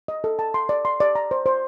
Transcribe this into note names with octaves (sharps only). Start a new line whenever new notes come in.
D#5
A4
A5
C6
D5
C6
D5
A#5
C5
C5